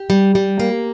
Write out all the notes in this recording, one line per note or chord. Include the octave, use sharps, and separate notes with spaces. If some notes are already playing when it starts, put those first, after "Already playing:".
Already playing: G4
G3
G3
A#3